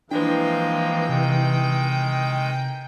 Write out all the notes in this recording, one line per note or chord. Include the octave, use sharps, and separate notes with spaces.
E3 F3 G#3 A#3 D4 B4 G5
C3 D#3 G#3